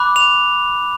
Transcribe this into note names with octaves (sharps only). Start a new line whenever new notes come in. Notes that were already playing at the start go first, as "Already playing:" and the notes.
Already playing: B5 D6 F#6
F7